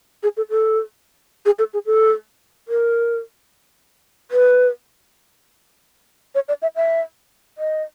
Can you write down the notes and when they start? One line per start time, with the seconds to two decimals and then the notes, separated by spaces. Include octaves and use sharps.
0.23 G#4
0.37 A4
0.50 A4
1.45 G#4
1.59 A4
1.73 G#4
1.86 A4
2.68 A#4
4.31 B4
6.35 C#5
6.48 D5
6.62 E5
6.76 E5
7.58 D#5